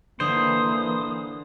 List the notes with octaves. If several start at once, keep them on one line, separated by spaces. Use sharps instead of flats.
D3 E3 A#3 C5 D#6